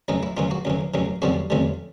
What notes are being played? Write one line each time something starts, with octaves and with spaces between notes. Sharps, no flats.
F#2 C#3 E3 D#4
E4
F#2 C#3 E3 F4
F#4
F#2 C#3 E3
F#2 C#3 E3
F2 C#3 E3 G3 F#4
F2 C#3 E3 G3